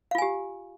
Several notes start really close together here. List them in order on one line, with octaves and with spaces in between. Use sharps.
F5 F4 G#5 G4